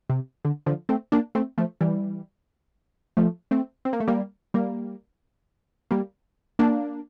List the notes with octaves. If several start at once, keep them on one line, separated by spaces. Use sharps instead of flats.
C3
D3
D3 F3
A3 C4
A#3 D4
A3 C4
F3 A3
E3 G3
F3 A3
A3 C4
C4
A#3
A3
G3 A#3
G3 A#3
G3 A#3
A#3 D4